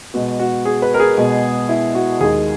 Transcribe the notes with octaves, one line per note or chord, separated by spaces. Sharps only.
B2 G#3 B3 F#4
F#4
G#4
B4
A#4
G#4
B2 G#3 B3
E4
F#4
D#2 D#3 G#3 G#4